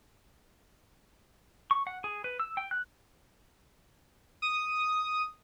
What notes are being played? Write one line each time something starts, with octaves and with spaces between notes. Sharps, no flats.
C#6
F#5
G#4
B4
E6
G5
F#6
D#6